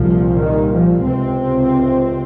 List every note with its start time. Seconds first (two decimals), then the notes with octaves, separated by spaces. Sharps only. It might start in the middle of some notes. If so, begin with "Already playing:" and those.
Already playing: C2 A#2 F3
0.39 D#3
0.73 F3
1.07 C#2 C3 C4